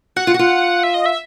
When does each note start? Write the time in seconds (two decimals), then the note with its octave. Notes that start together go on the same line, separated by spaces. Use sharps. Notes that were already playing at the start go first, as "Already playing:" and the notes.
0.16 F#4 F#5
0.27 F4
0.34 F#4
0.39 F4
0.83 E5
0.94 D#5
1.06 E5